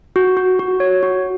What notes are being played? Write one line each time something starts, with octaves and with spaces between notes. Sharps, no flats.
F#4
F#4
F#4
C#5
F#4